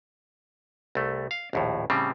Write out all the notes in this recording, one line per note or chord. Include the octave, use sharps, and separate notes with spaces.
C2 A3
F5
A#1 D#2 A2
A2 C#3 G3 C4